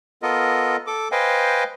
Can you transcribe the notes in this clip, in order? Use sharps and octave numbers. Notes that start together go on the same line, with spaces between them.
B3 F4 A4 A#4 D#5
A4 D6
B4 C5 D#5 F5 G5 G#5